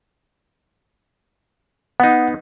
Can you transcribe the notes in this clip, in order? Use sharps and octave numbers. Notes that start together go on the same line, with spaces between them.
B3 D#4 F#5